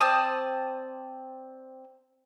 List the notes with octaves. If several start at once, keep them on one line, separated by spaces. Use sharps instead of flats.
C4 D5 A5 D#6